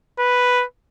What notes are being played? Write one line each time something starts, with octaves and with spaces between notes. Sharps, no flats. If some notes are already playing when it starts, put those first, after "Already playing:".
B4